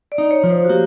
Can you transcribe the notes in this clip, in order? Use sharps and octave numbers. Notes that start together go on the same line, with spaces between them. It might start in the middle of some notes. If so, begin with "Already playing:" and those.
D5
D#4
C#5
F3
C5
F#4
A#3 G4